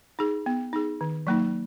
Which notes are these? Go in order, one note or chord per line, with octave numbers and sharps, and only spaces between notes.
D#4 G#4
B3
D#4 G#4
D#3
F#3 A#3 D#4